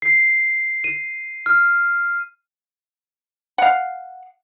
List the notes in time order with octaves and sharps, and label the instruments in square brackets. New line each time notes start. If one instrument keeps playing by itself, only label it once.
[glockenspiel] C7
D#7
F6
[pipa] F5 F#5